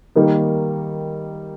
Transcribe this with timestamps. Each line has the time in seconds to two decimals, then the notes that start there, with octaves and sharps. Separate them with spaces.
0.16 D#3 G3 A#3 D#4